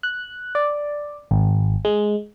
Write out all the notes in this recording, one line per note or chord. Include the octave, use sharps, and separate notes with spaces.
F#6
D5
G#1
G#3